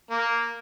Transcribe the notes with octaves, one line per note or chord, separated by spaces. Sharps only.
A#3